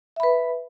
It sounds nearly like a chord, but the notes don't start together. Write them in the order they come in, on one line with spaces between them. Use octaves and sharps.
E5 B5 B4